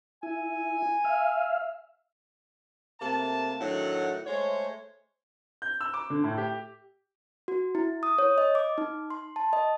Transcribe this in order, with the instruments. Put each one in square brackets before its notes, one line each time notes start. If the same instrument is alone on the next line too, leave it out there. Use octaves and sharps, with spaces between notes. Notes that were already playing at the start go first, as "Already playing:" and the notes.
[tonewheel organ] E4 [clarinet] G#5
[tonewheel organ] E5 F5
[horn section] C3 A3 A#3 A5
A2 D#3 F#3 D4 E5 F#5
G#3 A3 C5 C#5
[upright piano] G6
E6
D6
D3
A2
G4
[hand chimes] F#4
E4
D#6
C#5
D#5
D6
D#4
C6
A5
D#5